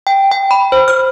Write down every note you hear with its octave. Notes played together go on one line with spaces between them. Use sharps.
G5
G5
B5
C5
F6